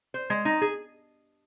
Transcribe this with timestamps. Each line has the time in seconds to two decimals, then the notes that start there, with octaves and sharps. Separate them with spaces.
0.14 C5
0.30 G#3
0.45 D#4
0.61 G#4